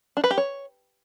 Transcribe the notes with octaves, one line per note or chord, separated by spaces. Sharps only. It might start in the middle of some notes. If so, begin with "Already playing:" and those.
D4
B4
G4
C#5